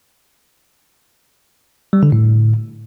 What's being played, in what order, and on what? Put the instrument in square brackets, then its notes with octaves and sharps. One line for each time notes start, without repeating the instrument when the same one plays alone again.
[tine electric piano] G3
D3
A2